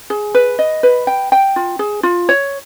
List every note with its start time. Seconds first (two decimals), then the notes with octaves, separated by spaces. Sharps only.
0.10 G#4
0.35 B4
0.59 D#5
0.83 B4
1.07 G5
1.32 G5
1.56 F4
1.79 G#4
2.03 F4
2.29 C#5